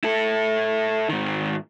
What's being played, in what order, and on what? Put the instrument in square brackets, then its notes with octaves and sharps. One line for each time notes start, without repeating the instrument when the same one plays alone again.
[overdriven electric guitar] E4 A4
G#2 D#3